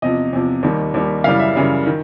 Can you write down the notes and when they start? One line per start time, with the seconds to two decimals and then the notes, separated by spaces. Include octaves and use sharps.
0.02 E2 C3 F3 D#5
0.33 E2 C3 F3
0.63 D#2 D#3 G3
0.94 D#2 D#3 G3
1.24 F#2 C#3 E3 G3 F5
1.39 E5
1.55 F#2 C#3 E3 G3
1.87 D#3